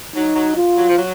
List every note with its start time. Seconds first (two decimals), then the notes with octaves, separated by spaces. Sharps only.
0.16 F#3 D#4
0.36 F#3
0.56 F4
0.77 F#3
0.89 F3
0.98 F#3